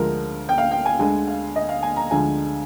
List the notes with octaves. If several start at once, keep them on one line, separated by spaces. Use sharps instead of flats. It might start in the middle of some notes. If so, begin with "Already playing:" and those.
Already playing: D2 D3 F3 G#3 A#4
G5
F5
G5
G#5
D2 D3 G#3 G#5
F5
D#5
F5
G#5
A#5
D2 D3 F3 G#3 G#5